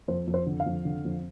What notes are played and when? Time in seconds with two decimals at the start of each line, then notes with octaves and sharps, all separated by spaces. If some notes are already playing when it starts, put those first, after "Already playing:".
0.08 F2 C5
0.27 F2
0.34 C5
0.46 D3
0.60 F5
0.66 F2
0.85 D3
1.05 F2